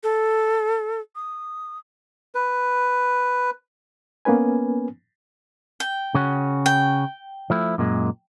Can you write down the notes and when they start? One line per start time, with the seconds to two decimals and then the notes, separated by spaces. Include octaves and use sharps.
0.03 A4
1.15 D#6
2.35 B4
4.25 A#3 B3 C#4 B4 G#5
5.80 G5
6.15 C#3 C#4 F#4
6.66 G5
7.50 F3 A3 E4
7.78 F#2 A#2 G#3